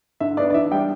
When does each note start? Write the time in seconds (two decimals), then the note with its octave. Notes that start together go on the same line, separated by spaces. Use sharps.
0.20 D3 E5
0.37 B3 D4 D5
0.50 D5
0.54 E3 E5
0.71 G3 D4 G5